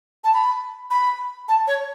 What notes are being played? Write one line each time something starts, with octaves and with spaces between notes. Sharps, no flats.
A5
B5
B5
A5
C#5